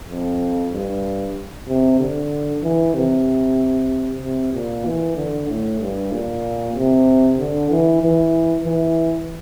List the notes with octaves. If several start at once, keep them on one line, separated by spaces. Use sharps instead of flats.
F2
G2
C3
D3
E3
C3
C3
A#2
E3
D3
A2
G2
A#2
C3
D3
E3
E3
E3